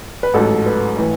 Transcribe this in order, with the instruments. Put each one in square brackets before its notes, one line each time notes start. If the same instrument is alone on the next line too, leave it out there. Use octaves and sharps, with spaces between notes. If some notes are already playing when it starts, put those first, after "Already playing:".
[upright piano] B4
A1 G#2 F#3 A4
B4
A2 E3